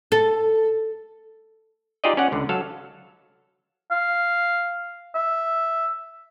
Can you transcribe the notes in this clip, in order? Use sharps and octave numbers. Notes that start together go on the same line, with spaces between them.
A4
D#4 F4 G4 G#4 D5 D#5
C#4 D5 F#5
C#2 D3
F#3 A4 F5
F5
E5